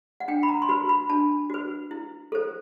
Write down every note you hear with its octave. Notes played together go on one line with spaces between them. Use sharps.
F#5
D4 G5
B5
A#5
C6
F#4 B4 B5
B5
D4 A5
F#4 B4
E4
A4 C5